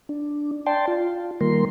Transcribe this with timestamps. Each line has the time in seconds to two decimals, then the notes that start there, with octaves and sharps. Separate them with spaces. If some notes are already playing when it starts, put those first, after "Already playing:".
0.09 D4
0.67 D5 G5 A5 C6
0.88 F4
1.41 D#3 G3 A#3 A#4 C6